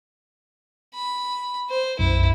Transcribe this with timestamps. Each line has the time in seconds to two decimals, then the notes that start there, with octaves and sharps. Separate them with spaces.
0.94 B5
1.70 C5
1.99 B1 F#2 E4